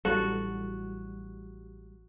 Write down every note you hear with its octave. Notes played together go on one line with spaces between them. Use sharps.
A1 F#3 G3 F#4 A4